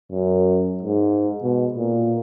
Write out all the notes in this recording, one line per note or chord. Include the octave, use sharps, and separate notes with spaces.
F#2
G#2
B2
A#2